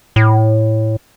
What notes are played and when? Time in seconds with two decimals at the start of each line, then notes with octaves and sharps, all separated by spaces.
0.16 A2